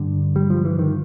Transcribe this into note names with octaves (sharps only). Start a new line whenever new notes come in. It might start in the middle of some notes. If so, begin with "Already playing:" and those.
Already playing: G2 D3
G3
F3
E3
D#3